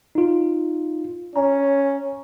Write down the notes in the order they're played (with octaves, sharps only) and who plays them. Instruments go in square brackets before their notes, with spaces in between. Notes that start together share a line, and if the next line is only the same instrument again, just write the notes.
[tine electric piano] D#4 F4
[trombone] C#4 [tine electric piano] G#5 A#5